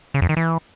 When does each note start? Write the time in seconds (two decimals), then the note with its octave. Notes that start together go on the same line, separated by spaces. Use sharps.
0.14 C#3
0.22 F2
0.29 D#3
0.37 E3